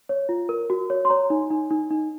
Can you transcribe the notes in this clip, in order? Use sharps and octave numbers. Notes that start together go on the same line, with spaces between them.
C#5
F4
A#4
F#4
C#5
C6
C#5 A#5
D#4
D#4
D#4
D#4